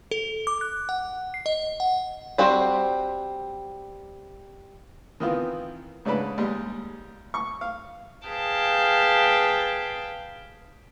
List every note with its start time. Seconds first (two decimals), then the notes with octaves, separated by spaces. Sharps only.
0.11 A4
0.47 D6
0.61 F#6
0.89 F#5
1.34 C7
1.46 D#5
1.80 F#5
2.38 G3 C4 F#4 C5
5.20 D#3 E3 B3 C4 F4
6.05 G#2 C#3 D4 B4 B5
6.38 D#2 G3 G#3
7.34 C#6
7.61 F5
8.27 G#4 B4 F5 G5 A5